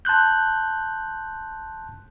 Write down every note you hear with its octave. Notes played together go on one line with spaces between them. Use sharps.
A5 C6 F#6 G6